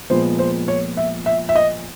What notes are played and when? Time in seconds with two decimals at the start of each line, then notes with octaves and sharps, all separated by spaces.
0.10 A#2 F3 G#3 B3 C5
0.39 C5
0.68 C#5
0.97 E5
1.26 E5
1.49 E5
1.55 D#5